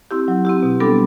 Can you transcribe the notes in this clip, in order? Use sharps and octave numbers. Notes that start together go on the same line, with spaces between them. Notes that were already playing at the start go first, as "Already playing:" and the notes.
C4 E4 G4
F#3
C4 E4 G4
B2
G3 B3 D4 A4